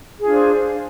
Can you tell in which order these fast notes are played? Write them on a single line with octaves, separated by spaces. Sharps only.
G#4 F4 D4 C5